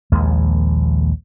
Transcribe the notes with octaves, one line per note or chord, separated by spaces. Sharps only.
A#1 D#2 G#3